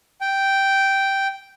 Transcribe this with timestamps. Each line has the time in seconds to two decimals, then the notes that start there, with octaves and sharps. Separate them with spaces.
0.21 G5